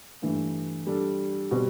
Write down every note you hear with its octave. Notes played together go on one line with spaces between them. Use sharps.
G2 E3 A3
G3 D4 A4
B2 G3 C4